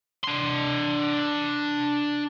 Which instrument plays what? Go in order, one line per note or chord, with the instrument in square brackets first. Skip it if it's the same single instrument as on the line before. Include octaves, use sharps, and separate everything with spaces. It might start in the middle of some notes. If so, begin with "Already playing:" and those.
[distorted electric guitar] D4 C6